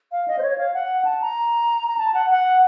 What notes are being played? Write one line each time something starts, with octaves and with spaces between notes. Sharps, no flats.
F5
D#5
C5
C#5
F5
F#5
A5
A#5
A#5
A5
F#5
F#5